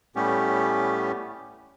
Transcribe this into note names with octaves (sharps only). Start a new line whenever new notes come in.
A2 G3 A3 B3 C#4 G4